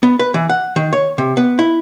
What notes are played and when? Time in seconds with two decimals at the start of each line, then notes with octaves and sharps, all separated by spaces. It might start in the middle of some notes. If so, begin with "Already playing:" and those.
0.03 B3
0.19 B4
0.34 E3
0.49 F#5
0.76 D#3
0.93 C#5
1.18 C3
1.37 B3
1.59 E4